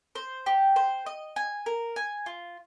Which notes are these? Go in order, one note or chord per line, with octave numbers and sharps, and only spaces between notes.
C5
G4
C5
D#5
G#5
A#4
G#5
F4